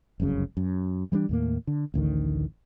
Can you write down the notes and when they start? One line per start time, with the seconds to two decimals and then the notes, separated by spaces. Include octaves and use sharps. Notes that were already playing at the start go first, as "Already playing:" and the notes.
0.20 F1 C2 F#2 C#3
0.57 F#2
1.12 E3 G3 G#3 D4
1.29 D#2 A2 A#3
1.67 D3
1.94 A1 D2 D3 D#3